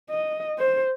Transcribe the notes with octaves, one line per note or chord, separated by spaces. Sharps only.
D#5
C5